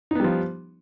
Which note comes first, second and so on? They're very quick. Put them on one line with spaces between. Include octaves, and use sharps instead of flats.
D#4 B3 G3 F3